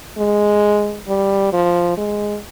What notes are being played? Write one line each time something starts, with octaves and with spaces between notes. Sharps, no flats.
G#3
G3
F3
G#3